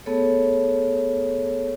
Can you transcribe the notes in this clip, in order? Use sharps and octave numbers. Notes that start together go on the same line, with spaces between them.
A3 B3 G#4 A4 C#5